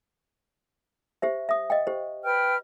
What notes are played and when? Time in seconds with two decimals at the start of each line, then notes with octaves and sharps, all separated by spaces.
1.22 G4 C5 E5
1.49 E5 D#6
1.70 D#5 F5 G5
1.87 G4 C5
2.23 B4 G5 F6